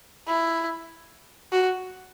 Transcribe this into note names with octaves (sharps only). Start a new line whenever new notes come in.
E4
F#4